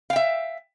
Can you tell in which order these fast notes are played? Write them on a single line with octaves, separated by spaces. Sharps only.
F5 G5 E5